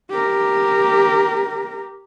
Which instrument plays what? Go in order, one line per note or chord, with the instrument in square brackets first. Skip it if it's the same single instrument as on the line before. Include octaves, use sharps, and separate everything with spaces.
[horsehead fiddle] G4 A#4